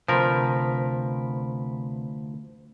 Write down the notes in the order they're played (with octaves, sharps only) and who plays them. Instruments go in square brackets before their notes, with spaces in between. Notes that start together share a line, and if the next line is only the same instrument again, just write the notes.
[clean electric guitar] D2 [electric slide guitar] C3 B4 [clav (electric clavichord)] F3 A#4